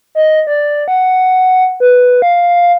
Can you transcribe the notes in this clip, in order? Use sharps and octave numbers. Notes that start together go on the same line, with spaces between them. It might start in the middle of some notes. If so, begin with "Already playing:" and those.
D#5
D5
F#5
B4
F5